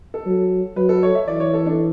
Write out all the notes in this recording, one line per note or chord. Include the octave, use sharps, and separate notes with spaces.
A4
F#3
F#3 B4
A4
C#5
E5
E3 D5
C#5
A4
D4